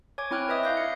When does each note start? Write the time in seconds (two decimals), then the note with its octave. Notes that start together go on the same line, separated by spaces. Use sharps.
0.18 C#5 G#5 D6 G#6
0.31 C4 E4 C#5 G5 F6 F#6
0.48 B4 D#5 E5 D#6
0.63 F5 G6 A#6
0.77 E4 C#7